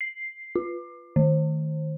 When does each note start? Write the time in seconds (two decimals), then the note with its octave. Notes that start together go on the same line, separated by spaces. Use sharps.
0.01 C7
0.55 F4
1.16 D#3